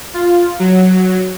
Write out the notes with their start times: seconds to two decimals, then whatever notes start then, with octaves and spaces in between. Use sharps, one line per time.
0.14 F4
0.59 F#3